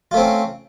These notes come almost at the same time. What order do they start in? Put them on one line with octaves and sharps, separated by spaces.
F4 A3 C4 C#4